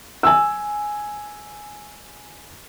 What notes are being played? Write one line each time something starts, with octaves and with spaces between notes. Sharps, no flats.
G#5 E6